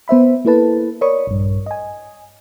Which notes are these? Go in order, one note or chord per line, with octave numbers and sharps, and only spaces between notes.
B3 C5 E5 B5
A#3 E4 A4 B4 A5
A#4 C#5 D5 B5 C#6 D#6
A#1 G2
D#5 G#5